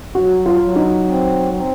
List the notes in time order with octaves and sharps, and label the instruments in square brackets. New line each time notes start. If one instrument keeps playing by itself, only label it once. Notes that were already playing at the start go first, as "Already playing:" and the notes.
[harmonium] F#3 [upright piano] F#4
[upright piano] F4
[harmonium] F#3
[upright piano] D#4
[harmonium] C4
C4